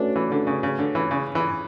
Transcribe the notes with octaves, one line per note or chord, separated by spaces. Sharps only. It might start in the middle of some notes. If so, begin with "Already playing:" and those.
Already playing: A3 C#4 D4 F#4 B4
E3
D3
C#3
C#3
D3
E3
C#3
E3